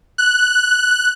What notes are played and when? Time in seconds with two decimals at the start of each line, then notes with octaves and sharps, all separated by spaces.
0.18 F#6